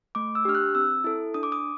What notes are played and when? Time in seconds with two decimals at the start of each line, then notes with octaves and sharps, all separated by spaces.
0.15 A3 D6
0.35 E6
0.45 D4 G4 F6
0.55 F#6
0.75 C4 E6
1.04 E4 A4
1.34 D4 D#6
1.43 D6
1.52 D#6